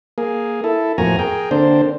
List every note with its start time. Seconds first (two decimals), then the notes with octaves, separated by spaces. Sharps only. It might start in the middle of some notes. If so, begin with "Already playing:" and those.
0.18 A#3 G#4
0.64 E4 A4
0.98 F2 A2 A#3 F#4 G#5 A#5
1.19 G#4 A#4 G5
1.51 D3 A#3 C4 D4 C5